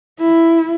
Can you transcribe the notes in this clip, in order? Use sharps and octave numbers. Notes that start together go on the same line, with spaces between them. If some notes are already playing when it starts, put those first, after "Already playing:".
E4